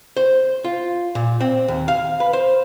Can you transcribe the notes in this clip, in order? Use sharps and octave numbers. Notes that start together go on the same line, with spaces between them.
C5
F4
A#2
C4
D#2
F5
B4
C5